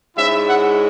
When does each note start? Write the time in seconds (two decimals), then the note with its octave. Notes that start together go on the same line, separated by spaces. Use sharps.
0.17 G#2 G#3 C#4 E4 E5
0.48 F#5